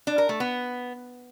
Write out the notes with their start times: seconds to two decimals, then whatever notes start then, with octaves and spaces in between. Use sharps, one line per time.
0.07 D4
0.18 A#4
0.29 A3
0.40 B3